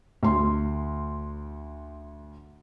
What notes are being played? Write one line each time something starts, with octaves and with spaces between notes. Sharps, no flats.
D2 C6